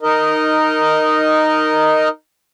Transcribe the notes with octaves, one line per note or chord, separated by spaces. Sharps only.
D#4 A#4 D#5